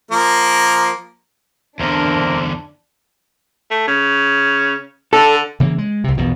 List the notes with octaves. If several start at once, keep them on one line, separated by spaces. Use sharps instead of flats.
F3 A#3 A#4
E2 D3 A#3 C4 D4 A#4
A3
C#3
D3 A4
C#3 E3 A#3
G#3
C2 C3
A#1 E2 B2